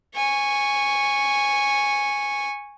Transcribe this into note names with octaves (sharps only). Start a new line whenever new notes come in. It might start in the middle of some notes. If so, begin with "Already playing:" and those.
G#5 C#6